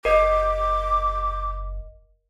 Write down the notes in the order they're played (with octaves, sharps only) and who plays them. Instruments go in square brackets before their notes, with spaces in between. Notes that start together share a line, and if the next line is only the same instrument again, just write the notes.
[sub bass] F#1 [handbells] A#4 D#5 [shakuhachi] D6